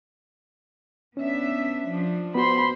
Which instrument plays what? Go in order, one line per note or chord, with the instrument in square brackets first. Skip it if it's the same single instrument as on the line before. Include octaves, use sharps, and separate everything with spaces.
[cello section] B3 D4 E5 [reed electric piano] C#4
[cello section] F3 D4
[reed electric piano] B3 F#4 [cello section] C5 [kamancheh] B5 C6